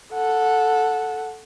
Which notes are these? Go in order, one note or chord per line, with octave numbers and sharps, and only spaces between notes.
A4 F#5